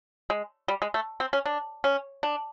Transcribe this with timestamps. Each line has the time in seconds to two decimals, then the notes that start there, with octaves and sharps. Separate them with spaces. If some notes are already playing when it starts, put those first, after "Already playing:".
0.30 G#3
0.68 G3
0.82 G#3
0.94 A3
1.20 C4
1.33 C#4
1.46 D4
1.84 C#4
2.23 D4